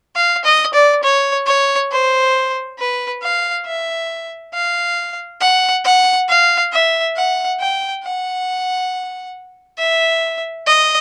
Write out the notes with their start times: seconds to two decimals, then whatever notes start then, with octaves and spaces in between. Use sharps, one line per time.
0.16 F5
0.44 D#5
0.73 D5
1.03 C#5
1.46 C#5
1.91 C5
2.78 B4
3.22 F5
3.65 E5
4.53 F5
5.40 F#5
5.84 F#5
6.28 F5
6.72 E5
7.16 F#5
7.60 G5
8.04 F#5
9.78 E5
10.66 D#5